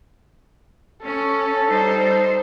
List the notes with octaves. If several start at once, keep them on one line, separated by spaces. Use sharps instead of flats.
C#4 A4
G3 D#4 C5